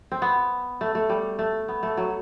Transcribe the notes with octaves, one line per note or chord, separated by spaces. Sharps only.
C4
B3
A3
A3
G3
A3
B3
A3
F#3